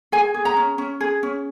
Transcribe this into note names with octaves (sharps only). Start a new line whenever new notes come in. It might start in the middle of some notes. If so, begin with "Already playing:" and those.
G#4 G#5
G#4
A#5
C#4
C#4
G#4
C#4